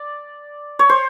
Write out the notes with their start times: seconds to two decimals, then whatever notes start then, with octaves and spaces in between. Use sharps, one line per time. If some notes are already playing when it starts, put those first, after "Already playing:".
Already playing: D5
0.79 C#5
0.89 C5